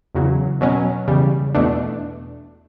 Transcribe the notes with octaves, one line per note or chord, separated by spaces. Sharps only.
E2 C#3 F#3
B2 F#3 C#4
E2 C#3 G3
E2 B2 A3 D4